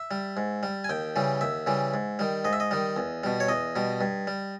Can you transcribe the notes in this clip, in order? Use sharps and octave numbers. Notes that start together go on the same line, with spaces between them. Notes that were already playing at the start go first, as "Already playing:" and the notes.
Already playing: E5
G3
G#2
G3
G#5
D#2 G5
C#3 E3 G3
D#2 E5
C#3 E3 G3
G#2
D#3 G3
G#2 D#5
E5
D#5
D#3 G3
E2
B2 G3
C#5
E2 D#5
B2 G3
G2
G3